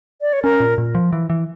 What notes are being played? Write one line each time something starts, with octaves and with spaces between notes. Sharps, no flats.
D5
C#5
C#4 A#4
A#2
A#2
F3
E3
E3